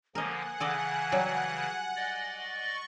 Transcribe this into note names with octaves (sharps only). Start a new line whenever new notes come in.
D3 F3 A#3 A#4 D#5 F#5 G#5
C#3 E3 A4 D5 D#5
F#3 G3
D5 D#5 A6
C#6